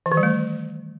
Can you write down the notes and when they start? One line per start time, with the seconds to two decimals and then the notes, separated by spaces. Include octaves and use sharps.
0.06 E3
0.12 D#3
0.17 G3
0.23 A3